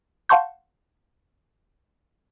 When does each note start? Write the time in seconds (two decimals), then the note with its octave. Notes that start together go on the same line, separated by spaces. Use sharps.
0.29 F5 F#5 A5 C6 C#6 G6